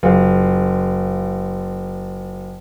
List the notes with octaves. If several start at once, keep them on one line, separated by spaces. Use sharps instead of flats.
F#1 F4